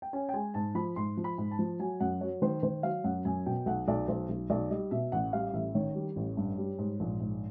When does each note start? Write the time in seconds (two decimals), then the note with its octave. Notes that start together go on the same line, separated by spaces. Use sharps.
0.02 G5
0.13 C#4 G#5
0.29 G5
0.34 G#3 G#5
0.54 G#2 A5
0.75 F3 B5
0.96 G#2 C6
1.17 F3
1.24 B5
1.38 G#2
1.51 A5
1.59 F3
1.79 F#3 G#5
2.00 F#2 F#5
2.21 F#3 C#5
2.42 D#3 C5
2.63 D#3 C5
2.83 F#3 F5
3.04 F#2 F#5
3.25 F#2 G#5
3.46 B2 G5
3.66 B1 F#5
3.88 B1 D5
4.08 B1 C5
4.29 B1
4.50 B1 D5
4.71 G3 D#5
4.91 B2 E5
5.12 A1 F#5
5.33 G3 F5
5.53 A1 E5
5.75 D#3 C#5
5.95 G3
6.16 A1
6.37 G2
6.58 G3
6.78 G#2
7.00 A#1
7.20 G#2